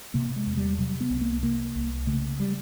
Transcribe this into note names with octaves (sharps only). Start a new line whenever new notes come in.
C3 A#3
G#3
E2
G3
C3 F#3
B3
C2
A#3
C3 A#3
C2
C#3 A3
G3